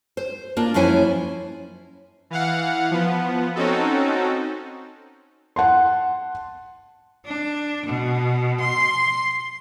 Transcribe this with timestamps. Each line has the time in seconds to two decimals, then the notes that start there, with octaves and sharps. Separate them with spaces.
0.17 C5
0.57 A#3 D4 F4
0.74 F#2 F3 C#4 E4 C5 G#5
2.30 E3 F5 F#5
2.91 F3 B3
3.56 C4 C#4 D#4 F#4 A4
5.56 F#5 A5 C6
7.25 D4
7.86 B2
8.60 C6